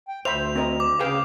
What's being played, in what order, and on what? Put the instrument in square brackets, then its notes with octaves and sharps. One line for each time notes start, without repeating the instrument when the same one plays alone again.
[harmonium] G5
[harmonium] D2 [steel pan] C5 E5 B5 [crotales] F7
[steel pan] C4 A#4 D#5
[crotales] D6
[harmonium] C#3 F5 [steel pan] G#4 B4 G5